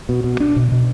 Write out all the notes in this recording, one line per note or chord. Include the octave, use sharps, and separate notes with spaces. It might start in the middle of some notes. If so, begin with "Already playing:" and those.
B2
B2
D4
B2
B2